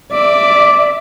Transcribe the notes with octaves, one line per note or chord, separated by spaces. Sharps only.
D5 E5 D6